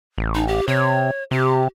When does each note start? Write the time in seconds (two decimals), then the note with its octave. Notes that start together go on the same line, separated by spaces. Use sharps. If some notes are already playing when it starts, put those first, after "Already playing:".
0.18 A1
0.35 D#4
0.48 G4
0.68 C3 C#5
1.31 C3 G4